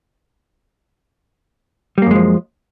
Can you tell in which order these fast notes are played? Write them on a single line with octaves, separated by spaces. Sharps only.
G3 A#3 F#2 G#3 F3